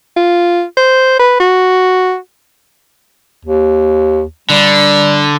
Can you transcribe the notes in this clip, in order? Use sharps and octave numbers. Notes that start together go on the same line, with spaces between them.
F4
C5
B4
F#4
D#2
D3 G3